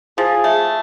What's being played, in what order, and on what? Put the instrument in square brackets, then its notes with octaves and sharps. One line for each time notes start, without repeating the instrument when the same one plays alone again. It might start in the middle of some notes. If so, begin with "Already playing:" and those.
[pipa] F3 [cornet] G#4
[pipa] A3